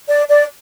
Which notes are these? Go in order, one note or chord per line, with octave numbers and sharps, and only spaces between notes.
D5
D5